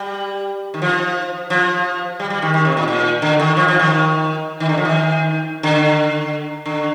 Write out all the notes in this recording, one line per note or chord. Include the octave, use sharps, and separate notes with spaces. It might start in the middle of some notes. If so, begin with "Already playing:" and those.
Already playing: G3
D#3
F3
F3
G3
G3
D#3
D#3
C3
A#2
A#2
D3
D#3
F3
F3
D#3
D#3
D3
F3
D#3
D3
D3